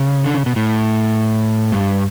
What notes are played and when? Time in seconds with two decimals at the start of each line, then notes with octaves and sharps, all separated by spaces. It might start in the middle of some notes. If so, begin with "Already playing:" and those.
Already playing: C#3
0.24 D3
0.35 C#3
0.46 B2
0.56 A2
1.72 G2